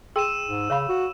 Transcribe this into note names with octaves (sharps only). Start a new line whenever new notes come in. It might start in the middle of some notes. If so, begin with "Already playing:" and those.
G#4 G5 C6 E6 D#7 E7
G#2
C#3 C#5 F5 B5
F#4